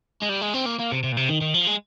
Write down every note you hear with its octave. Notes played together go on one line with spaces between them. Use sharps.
G#3
G3
G#3
C4
A#3
A#3
C3
C3
A#2
C3
D#3
D#3
F3
G#3